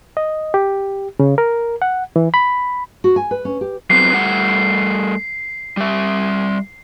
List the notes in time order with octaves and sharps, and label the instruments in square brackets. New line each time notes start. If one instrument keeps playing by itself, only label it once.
[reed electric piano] D#5
G4
C#3
A#4
F#5
E3
B5
[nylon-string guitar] F#4
G#5
B4
C#4
G4
[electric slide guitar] F#3 B3 C4 [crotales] C7
[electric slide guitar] G3 A3 F#5
G3 E5